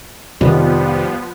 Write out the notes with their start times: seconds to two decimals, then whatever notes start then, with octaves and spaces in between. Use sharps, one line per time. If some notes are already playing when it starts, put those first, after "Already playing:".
0.41 F2 C3 D#3 F3 G3 B3